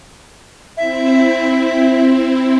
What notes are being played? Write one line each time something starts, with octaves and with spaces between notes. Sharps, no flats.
C4 E4 E5